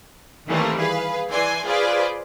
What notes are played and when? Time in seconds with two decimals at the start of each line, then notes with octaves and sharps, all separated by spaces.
0.48 D#3 E3 G3 A3 A#3 C4
0.78 G#4 B4 F5
1.30 E3 D5 G#5 C6
1.65 F4 G#4 B4 C5 D5